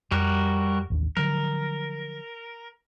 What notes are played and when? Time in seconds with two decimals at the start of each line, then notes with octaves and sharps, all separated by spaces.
0.11 F2 G3 F#4 A#4
0.90 A1 D#2 D4
1.17 D3 F3 F#3 A#4